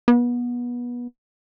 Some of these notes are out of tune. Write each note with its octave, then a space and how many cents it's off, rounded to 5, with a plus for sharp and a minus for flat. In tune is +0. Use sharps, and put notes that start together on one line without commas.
B3 -25